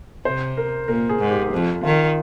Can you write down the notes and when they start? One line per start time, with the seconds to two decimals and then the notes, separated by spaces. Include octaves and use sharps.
0.25 C3 C5
0.57 A#4
0.88 A#2 A#4
1.09 G#4
1.20 G#2
1.30 G4
1.53 F2
1.83 D#3 F4